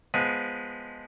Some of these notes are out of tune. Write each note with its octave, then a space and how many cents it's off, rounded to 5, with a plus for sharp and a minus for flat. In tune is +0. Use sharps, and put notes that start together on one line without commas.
F3 +5 G#3 +0 B3 +0